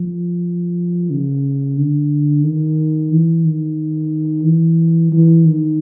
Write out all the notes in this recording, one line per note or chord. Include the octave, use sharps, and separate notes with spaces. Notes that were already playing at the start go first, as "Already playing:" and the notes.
Already playing: F3
C#3
D3
D#3
E3
D#3
E3
E3
D#3